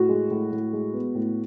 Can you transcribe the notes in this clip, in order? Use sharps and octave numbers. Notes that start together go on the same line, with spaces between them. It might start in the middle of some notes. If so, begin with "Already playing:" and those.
Already playing: A2 F#4
G#3
A2
A2
G#3
B3
A2